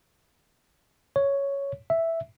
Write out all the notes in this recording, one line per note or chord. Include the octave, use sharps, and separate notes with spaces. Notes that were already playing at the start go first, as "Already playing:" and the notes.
C#5
E5